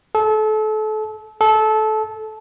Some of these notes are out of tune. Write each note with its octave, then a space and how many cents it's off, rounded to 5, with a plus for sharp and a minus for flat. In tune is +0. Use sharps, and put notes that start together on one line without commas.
A4 -30
A4 -20